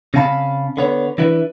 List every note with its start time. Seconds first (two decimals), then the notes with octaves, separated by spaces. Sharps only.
0.14 C#3 C4 C#4 F5 A5 B5
0.77 D3 B3 C#5
1.18 E3 D4 E4 B4